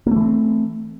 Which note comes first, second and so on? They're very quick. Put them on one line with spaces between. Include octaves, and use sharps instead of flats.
A#3 A3 E3 C4